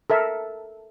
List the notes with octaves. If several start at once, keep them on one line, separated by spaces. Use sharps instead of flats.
A4 A#4 E5